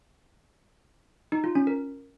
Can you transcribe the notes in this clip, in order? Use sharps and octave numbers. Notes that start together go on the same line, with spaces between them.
D#4
F4
C#4
A#4